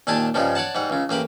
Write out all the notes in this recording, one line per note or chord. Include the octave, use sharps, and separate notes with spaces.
D#2 A#2 D4 G4 G#5 A5
G2 C#3 F3 G3 G#3
C#5 D5 F#5 A5
G#2 G3 F#5
C#2 C#3
A1 A#3 G4 B5